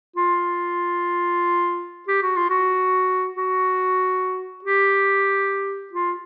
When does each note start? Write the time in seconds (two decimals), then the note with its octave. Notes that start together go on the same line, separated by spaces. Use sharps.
0.16 F4
2.08 G4
2.23 F#4
2.36 F4
2.50 F#4
3.37 F#4
4.64 G4
5.93 F4